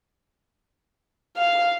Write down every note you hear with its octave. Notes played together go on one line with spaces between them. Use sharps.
F5